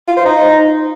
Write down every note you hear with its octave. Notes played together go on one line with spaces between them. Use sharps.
F4
C5
D#4